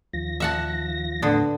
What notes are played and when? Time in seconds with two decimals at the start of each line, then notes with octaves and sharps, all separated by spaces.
0.13 D#2 F3 A#6
0.40 E5 F#5 A5
1.22 A2 D3 B3